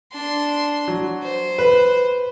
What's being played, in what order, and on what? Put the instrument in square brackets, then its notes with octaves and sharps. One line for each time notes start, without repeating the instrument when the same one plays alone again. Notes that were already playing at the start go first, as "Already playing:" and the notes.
[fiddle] D4 C6
[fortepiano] F#3
[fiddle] C5
[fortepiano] B4